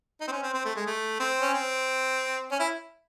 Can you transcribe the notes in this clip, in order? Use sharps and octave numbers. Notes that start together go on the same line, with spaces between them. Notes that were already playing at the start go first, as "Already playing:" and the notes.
D#4
C4
C#4
C4
C4
A3
G#3
A3
C4
C#4
C4
C#4
E4